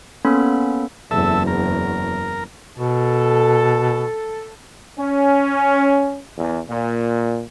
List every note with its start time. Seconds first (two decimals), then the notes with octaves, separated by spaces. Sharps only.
0.25 A#3 B3 C#4 A4 B5
1.11 F#1 E2 A4 E5
1.47 A#4
2.78 B2 A4
4.98 C#4
6.38 E2
6.69 A#2